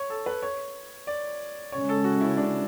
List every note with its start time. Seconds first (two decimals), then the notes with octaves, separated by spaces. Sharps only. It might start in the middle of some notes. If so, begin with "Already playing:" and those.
Already playing: C#5
0.10 A4
0.26 B4
0.42 C#5
1.07 D5
1.72 C#3 G#3 C#4 C#5
1.89 A4
2.04 F#4
2.21 E4
2.37 D4